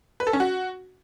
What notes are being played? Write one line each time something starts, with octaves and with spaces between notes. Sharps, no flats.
B4
A4
C#4
F#4